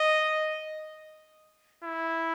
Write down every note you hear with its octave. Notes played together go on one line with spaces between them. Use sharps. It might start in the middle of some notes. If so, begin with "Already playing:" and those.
Already playing: D#5
E4